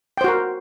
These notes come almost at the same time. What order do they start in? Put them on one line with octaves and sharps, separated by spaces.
G5 C5 F#4 A#4